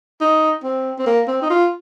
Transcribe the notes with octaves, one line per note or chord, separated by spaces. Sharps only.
D#4
C4
C4
A#3
C4
D#4
F4